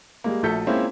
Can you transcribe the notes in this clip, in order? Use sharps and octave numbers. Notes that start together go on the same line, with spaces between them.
G3 G#3 A#3
A#1 A3 F#4 A4 G6 B6
G#3 A#3 C4 C#4 E4 F4